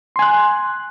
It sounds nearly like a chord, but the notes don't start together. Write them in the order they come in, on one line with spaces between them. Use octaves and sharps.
C6 G#5 F#6